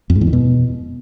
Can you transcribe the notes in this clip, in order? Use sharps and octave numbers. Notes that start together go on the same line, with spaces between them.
F2
G#2
E2
D#3
B2